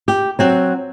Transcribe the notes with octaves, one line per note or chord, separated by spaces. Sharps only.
G4
F#3 C4 F#4